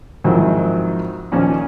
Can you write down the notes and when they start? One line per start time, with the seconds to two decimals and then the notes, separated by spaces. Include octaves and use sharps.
0.24 F2 G#2 D#3 F#3 C4 E4
1.32 A#2 D#3 F3 C#4